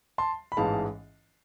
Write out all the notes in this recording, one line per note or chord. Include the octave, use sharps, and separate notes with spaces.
A5 C6
B5
A1 G#2 E3 G#3 F5 A5